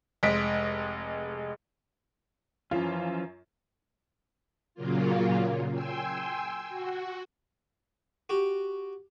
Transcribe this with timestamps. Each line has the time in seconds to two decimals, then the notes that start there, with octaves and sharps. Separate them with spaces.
0.23 F1 G#3 D#5 B6 D7
2.71 F#2 E3 F3 C#4 F4
4.75 A#2 C#3 F#3 A#3 F4
5.73 G5 G#5 C6 E6
6.69 F#4
8.29 F#4 G4